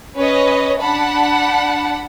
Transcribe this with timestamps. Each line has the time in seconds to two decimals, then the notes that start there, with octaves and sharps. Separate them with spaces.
0.17 C#4 B4 C#5 D#5
0.80 D4 F#5 A5 B5